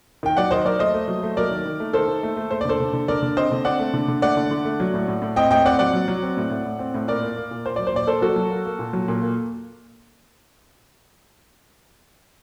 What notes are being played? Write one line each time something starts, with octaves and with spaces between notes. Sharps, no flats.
D#3 G5
F#3 D5 F#5
D#3 C5 D#5
F#3 A#4 D5
A3 C5 D#5
A3
F#3
A3
F#3 A#4 D5
D#3
D#3
A3
D#3 A4 C5
D#3
A3
A3
A3 C5
D5
D3 A4 C5
D3
D3
D3 A#4 D5
D3
C4 C5 D#5
D3
C4 D5 F#5
A3
D3
D3
A3 D5 F#5
D3
D3
A3
F#3
A2
A2
A2
C4 D#5 G5
A2 D#5 G5
C4 D5 F#5
F#3 D5 F#5
F#3
F#3
C4
A2
A2
A2
C4
A2
A#2 A#4 D5
A#3
A#3
A#2
A#3 C5
F#3 D5
C5
A#2 D5
A#3 A4 C5
F#3 F#4 A4
F#3
A#3
A#3
A#2
F#3
A#2
A#3